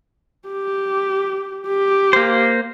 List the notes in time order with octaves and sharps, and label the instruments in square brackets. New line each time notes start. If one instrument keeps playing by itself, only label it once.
[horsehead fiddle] G4
G4
[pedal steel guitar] A#3 C5